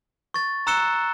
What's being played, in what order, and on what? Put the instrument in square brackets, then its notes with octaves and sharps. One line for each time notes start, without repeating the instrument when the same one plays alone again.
[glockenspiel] C#6 A6
A#5 E6 F#6 C#7 E7 G7